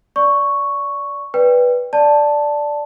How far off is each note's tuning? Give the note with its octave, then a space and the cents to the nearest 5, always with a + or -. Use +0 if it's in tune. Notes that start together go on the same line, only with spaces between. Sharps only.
D5 -15 C#6 +0
B4 -5 D5 +0 G5 +15
D5 +0 A5 +0